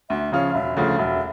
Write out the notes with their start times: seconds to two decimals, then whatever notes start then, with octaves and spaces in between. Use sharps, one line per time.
0.10 D2 E5
0.32 C#3 F3 C#4 F5
0.54 E1 E5
0.76 D2 C#3 F3 A3 F5
0.99 E1 E5